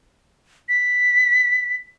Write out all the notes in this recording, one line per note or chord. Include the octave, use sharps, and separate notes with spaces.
B6